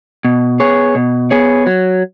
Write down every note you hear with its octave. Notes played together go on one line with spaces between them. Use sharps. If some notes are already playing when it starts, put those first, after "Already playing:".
B2
B3 G#4 C#5
B2
B3 G#4 C#5
F#3